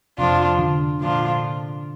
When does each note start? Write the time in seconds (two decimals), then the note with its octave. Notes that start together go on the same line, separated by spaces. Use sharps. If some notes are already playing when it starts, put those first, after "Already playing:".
0.18 F2 C3 F3 D4 F4
0.59 D3
1.00 A#2 F3 D4 F4